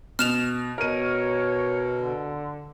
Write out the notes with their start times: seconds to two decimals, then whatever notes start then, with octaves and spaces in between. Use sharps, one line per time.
0.19 B2 F6 E7 F7
0.78 B2 A#4 C#5 D#7
1.95 D3